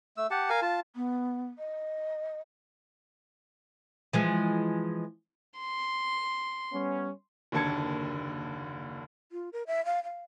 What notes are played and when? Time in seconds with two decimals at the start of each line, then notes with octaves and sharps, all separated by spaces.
0.17 A3 E6
0.31 G4 F#5 A5
0.50 A#4 F5 G#5
0.62 F4 A5
0.96 B3
1.58 D#5
4.13 E3 F3 G#3
5.59 C6
6.72 G3 B3 C#4
7.52 F#1 D#2 D3 A5 G#6 C#7
9.32 F4
9.53 A#4
9.67 E5
9.85 F5
10.04 F5